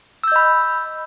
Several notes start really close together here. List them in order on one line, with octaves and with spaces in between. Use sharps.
E6 G6 D#5 B5